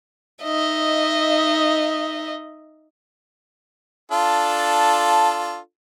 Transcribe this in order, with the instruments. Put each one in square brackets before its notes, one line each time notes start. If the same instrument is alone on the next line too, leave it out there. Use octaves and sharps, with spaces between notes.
[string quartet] D#4 D#5 E5
[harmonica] D4 F4 A4